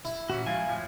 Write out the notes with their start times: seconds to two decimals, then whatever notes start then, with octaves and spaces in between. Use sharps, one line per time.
0.05 E4
0.30 A#2 E3 C#4 F#4
0.46 F3 G#3 F5 G#5
0.68 F2 A2 F3